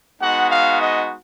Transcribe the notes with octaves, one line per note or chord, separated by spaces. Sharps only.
G#3 B3 D#4 F#4 F#5
F5
D#5